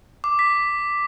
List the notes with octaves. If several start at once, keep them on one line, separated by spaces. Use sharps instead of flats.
D6
B6